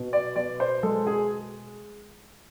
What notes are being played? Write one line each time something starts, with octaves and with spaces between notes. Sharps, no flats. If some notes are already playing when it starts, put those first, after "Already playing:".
Already playing: B2
D5
B2 D5
C5
G#3 A4
G#4